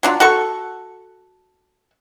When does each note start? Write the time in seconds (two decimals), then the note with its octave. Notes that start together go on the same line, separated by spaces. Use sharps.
0.03 F#3 D4 F4
0.20 F#4 A4 C#6